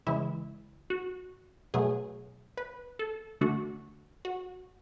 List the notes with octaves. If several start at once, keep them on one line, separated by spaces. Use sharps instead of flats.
C#3 E3 G#3 E4
F#4
B2 F#3 A3 G#4
B4
A4
D3 A3 D4 F#4
F#4